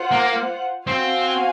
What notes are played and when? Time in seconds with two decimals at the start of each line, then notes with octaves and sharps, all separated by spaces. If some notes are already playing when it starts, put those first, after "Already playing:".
Already playing: F4 C5 F#5
0.11 A#3
0.86 C4 F#4 C5 F5 G#5